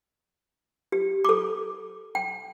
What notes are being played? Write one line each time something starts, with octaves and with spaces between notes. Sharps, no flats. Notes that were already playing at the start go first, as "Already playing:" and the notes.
G4
A4 D6
G5